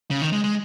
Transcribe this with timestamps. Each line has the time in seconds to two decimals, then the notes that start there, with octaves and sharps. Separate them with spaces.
0.11 C#3
0.22 D#3
0.33 G#3
0.44 G#3